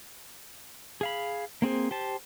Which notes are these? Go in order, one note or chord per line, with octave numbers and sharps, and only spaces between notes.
G#4 F5 B5
A#3 C4 G#4 C5
G4 C5 A5